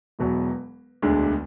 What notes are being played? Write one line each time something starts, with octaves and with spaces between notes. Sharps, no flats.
E1 E2 B2 F#3
E1 D2 D3 G#3 D4